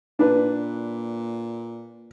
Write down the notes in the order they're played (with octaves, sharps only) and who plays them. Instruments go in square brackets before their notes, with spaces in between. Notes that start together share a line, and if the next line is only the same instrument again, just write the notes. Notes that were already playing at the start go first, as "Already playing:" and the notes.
[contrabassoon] A#2 [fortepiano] D4 B4